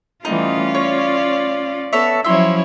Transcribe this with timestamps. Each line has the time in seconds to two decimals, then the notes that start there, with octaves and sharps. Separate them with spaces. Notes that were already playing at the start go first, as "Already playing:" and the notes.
0.25 E3 G3 A3 C#4 D#4 F4
0.75 C#5 D5
1.93 B3 A4 C#5 E5
2.24 F3 F#3 C#4 E4 C#5 E5 C6